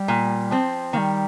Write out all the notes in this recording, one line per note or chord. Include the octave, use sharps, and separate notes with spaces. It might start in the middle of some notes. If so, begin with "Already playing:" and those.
Already playing: G3
A#2
F3 C4
D#3 G3 A#3